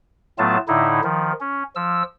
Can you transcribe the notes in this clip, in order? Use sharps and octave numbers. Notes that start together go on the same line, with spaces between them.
A2 F#3 A3 B3 F4 A5
A2 D3 D#4 E4
D#3 F3
C#4
F3 E6